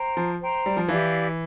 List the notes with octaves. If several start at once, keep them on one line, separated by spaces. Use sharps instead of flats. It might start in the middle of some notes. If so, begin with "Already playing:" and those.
Already playing: C5 G5 A#5
F3
C5 G5 A#5
G3
F3
E3 E4 G4 D5 F5